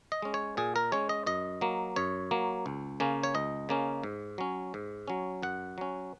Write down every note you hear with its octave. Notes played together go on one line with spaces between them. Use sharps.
D#5
G#3 C#4
C#5
A#2 G#4
A#4
G#3 C#4 C#5
D#5
F#2 D#5
F#3 A#3
F#2 C#5
F#3 A#3
C#2
C#3 A#3 C#4
C#5
C#2 D#5
C#3 A#3 C#4
G#2
F#3 C#4
G#2
F#3 C#4
F#2 F#5
F#3 C#4